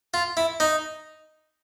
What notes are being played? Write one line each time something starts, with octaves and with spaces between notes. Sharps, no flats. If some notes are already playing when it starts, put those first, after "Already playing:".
F4
E4
D#4